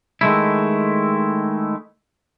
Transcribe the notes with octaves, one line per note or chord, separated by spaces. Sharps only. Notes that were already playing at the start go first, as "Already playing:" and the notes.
D#3 G#3 A3 E4